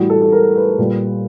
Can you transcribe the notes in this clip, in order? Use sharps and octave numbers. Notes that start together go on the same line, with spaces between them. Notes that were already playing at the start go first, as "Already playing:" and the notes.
Already playing: A2 E3 G3 F#4
A4
A4
A#4
B4
A#2 G3